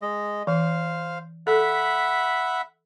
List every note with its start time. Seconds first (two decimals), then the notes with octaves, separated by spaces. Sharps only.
0.02 G#3 D#5
0.47 E3 C5 F5
1.47 A4 E5 F#5 B5